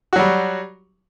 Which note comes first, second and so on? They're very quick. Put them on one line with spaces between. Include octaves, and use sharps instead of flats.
F#4 F#3 G3